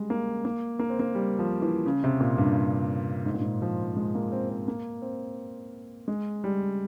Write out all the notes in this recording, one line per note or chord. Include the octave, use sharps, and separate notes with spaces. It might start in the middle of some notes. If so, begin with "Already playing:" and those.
Already playing: G3 G#3
A#3
A#3
A#3
C4
A#3
G3
F3
E3
C#3
C3
A#2
G2
G#2
A#2
G#2
F3
G#3
A#3
C4
C4
A#3
C4
G#3
G3